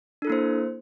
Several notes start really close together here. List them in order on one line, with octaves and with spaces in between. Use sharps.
D4 A4 E4 A#3 C5